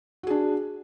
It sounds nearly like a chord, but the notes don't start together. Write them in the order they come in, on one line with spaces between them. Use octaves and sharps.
F#4 G#4 D4